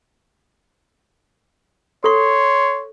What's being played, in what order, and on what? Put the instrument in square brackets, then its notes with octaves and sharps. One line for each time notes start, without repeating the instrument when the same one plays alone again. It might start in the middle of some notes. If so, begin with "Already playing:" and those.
[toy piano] A4 C#6 [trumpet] C#5 [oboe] C6